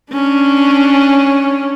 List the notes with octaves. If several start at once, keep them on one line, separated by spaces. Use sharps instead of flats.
C#4 D4